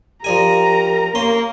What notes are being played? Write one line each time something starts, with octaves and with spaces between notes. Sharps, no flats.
F3 G4 A#4 D5 G#5 A#5
A#3 C#4 C6